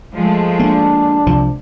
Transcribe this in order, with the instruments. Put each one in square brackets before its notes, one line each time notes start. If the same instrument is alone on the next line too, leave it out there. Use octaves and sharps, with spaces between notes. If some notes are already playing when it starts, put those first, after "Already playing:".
[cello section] F3 G#3 A3
[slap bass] A#3 [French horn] D4
[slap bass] C2 F3